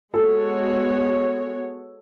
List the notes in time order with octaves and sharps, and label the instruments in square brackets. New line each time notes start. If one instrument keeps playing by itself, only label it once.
[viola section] G#3 B3 F#4 C#5 [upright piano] A4